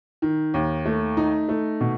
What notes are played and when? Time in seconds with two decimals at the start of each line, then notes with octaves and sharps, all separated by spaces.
0.22 D#3
0.54 D#2
0.86 A3
1.17 D#4
1.49 A3
1.80 B2